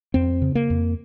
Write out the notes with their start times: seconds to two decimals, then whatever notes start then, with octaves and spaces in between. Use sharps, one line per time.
0.14 F2 C4
0.42 C#3
0.55 A#3
0.70 F2